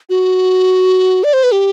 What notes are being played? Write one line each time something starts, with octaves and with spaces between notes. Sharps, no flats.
F#4
D5
C5
B4
G4